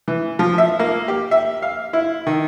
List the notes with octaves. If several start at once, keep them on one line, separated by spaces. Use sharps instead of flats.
E3
F3
E5
A#3
G4
E5
F5
E4
D#3